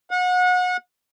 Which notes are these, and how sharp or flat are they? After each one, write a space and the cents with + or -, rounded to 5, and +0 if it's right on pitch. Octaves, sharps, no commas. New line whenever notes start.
F#5 -30